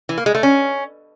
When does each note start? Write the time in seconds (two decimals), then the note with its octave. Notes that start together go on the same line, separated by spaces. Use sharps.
0.09 E3
0.18 A#3
0.26 G#3
0.35 A3
0.43 C#4